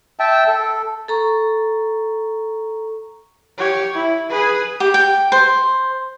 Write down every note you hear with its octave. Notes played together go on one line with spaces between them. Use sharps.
E5 G5 A5
A4
A4 A#5 C#6
G4 C#5
E4
G#4 B4
G4
G5
C5